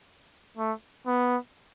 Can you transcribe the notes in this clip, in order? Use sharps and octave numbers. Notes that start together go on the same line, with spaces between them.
A3
B3